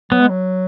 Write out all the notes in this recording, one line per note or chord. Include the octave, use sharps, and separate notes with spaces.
F#3 B3
G#3
F#3